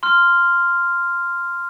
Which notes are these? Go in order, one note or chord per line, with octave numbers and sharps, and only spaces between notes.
C6 F6